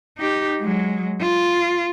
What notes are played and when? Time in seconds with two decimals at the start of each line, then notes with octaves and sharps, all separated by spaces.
0.17 D#4 G4
0.60 F#3 G#3
1.21 F4